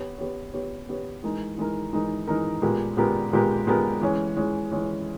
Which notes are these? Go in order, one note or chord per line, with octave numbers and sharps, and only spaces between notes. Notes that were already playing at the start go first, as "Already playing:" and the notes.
Already playing: B3 G4 C#5
B3 G4 C#5
B3 G4 C#5
B3 G4 C#5
E3 G#3 D#4 A#4
E3 G#3 D#4 A#4
E3 G#3 D#4 A#4
E3 G#3 D#4 A#4
A#2 G#3 B3 G4 A#4
A#2 G#3 B3 G4 A#4
A#2 G#3 B3 G4 A#4
A#2 G#3 B3 G4 A#4
E3 G#3 C#4
E3 G#3 C#4
E3 G#3 C#4